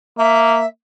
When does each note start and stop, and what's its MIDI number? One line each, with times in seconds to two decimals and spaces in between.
0.18 0.64 58
0.18 0.66 76